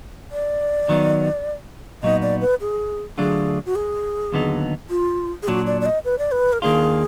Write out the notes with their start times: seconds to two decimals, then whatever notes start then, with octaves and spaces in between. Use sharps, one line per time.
0.31 D5
0.89 D#3 F#3 B3 D#4
2.03 A#2 F#3 B3 D#4 D#5
2.22 D5
2.41 B4
2.61 G#4
3.18 D2 D3 F#3 D4 F4 G#4
3.66 F#4
3.75 G#4
4.32 D#2 D3 F#3 B3 D#4
4.90 F4
5.42 G#4
5.48 A#2 F#3 D4 F#4
5.67 D5
5.81 D5
5.86 D#5
6.05 B4
6.19 D5
6.32 B4
6.53 A#4
6.62 D#2 D#3 A#3 D4 F4 G#4